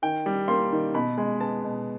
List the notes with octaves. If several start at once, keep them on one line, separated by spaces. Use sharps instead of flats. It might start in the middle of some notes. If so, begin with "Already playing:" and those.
D#3 G5
G3
A#3 C6
D#3
B2 B5
G#3
B3 A5
B2